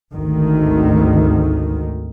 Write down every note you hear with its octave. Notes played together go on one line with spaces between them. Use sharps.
G#1 D2 D#3